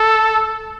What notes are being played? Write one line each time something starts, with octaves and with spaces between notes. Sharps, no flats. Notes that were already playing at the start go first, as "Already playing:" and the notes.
Already playing: A4